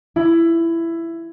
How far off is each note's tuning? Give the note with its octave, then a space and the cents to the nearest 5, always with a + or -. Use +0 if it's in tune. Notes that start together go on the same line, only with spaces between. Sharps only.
E4 +15